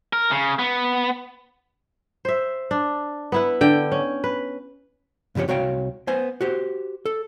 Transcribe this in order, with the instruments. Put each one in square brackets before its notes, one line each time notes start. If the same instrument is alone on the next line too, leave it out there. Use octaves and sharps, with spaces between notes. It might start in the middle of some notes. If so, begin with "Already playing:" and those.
[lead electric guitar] A#4
C#3
B3
[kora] C5 E5
D4
B3 E4 B4
D3 G5
C#4
B4
[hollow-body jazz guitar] G2 C#3 F3 G4 C#5
C2 F#4 C#5 F5 G5
B3 C5 G#5
F#4 G4 C5
A4